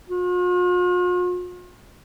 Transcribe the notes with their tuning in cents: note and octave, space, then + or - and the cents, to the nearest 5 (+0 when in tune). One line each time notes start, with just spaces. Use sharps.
F4 +45